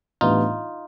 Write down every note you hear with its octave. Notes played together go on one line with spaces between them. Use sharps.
A2 E3 G3 B3 D4 D#4 F4